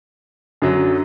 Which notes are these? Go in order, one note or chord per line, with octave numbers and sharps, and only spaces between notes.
F#2 D3 F#3